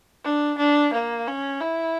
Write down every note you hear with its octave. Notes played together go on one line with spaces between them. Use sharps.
D4
D4
A#3
C#4
E4